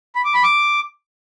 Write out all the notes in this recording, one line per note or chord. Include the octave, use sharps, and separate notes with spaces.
B5
D6
B5
D6